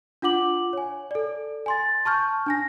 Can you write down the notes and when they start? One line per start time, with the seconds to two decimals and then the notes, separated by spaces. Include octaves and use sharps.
0.22 D4 F4 F#5 D6 F#7
0.73 C#5 G#5
1.11 A4 D5
1.66 G#5 C6 A6
2.05 A5 C#6 F6 G6
2.46 D4 G#5 A#6